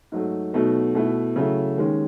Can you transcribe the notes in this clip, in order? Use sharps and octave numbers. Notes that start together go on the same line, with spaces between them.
G#2 F#3 A3
B2 F#3 A3 D#4
B2 A3 E4
C#3 F#3 A3 E4
D#2 D#3 G#3 C#4